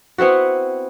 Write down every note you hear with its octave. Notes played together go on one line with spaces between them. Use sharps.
B3 C4 E4 F#4